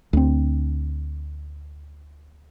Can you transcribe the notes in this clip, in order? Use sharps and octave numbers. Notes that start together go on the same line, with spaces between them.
D2 C4